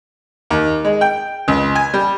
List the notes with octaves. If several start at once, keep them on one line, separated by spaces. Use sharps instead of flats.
D#2
G#3
G5
C#2
G#5
G3